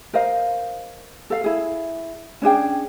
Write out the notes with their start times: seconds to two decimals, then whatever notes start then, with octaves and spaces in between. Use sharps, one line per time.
0.14 A#4 C5 D#5 F5
1.30 A4 F5
1.44 E4 G#4
2.42 C#4 D4 G#4 G5